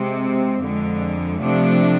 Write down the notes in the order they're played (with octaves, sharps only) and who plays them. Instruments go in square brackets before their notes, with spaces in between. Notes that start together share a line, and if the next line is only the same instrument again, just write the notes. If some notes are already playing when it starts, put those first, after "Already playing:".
Already playing: [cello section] C3 G#3 C4
F2 D3 G#3
C3 F3 A3 D4